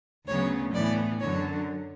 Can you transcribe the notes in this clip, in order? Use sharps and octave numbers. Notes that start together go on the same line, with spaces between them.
D2 C#3 F#3 B3 C#5
A2 E3 B3 D5
F#2 D3 F#3 C#5